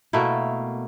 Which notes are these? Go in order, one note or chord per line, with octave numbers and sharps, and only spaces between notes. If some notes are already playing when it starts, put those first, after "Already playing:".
B2 A3 A#3 E4